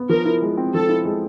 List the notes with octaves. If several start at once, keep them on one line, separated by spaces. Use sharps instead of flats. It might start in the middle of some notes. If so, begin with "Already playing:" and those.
Already playing: B3
F3 A#4
E4
G#3
C4
F3 A4
E4
G#3